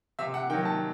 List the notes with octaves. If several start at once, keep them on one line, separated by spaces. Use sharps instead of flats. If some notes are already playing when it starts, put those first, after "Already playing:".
C3 E5
F#5
D#3 F#3 G5
A5